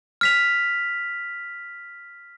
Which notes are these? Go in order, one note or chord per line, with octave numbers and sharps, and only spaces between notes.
F6 B6 F7